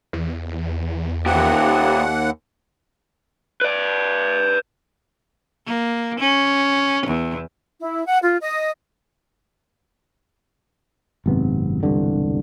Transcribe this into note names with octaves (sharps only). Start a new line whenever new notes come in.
E2
D#2 A#2 G4 F#5
B4 D5
A#3
C#4
E2
E4
F#5
F4
D#5
G#1 F#2 C3 B3
E1 C2 G2 D3